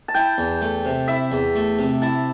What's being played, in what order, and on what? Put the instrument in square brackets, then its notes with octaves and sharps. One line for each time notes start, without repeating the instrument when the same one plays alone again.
[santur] A5
[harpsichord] E4 [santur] G5
[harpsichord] E2
A3
C3
[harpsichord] E4 [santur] E5
[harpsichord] E2
A3
C3
[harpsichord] E4 [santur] A5